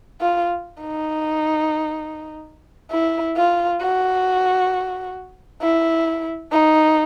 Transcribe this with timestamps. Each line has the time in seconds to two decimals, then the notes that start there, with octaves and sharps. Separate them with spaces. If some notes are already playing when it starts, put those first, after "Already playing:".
0.21 F4
0.82 D#4
2.91 E4
3.37 F4
3.81 F#4
5.62 E4
6.52 D#4